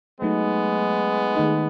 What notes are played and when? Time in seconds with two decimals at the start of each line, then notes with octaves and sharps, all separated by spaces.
0.21 F#3 G#3 A3 B3 D#4
1.35 D#3 A3 D#4 G#4